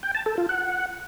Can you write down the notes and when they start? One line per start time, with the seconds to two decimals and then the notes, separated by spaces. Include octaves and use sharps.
0.03 G5
0.15 A5
0.26 A4
0.38 F4
0.49 F#5